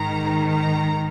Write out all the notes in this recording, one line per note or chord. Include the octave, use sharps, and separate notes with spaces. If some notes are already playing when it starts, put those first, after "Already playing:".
Already playing: G#2 D#3 A#5
A#5